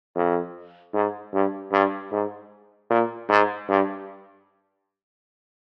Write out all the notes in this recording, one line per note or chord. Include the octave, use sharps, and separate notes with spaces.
F2
G#2
G2
G2
G#2
A#2
G#2
G2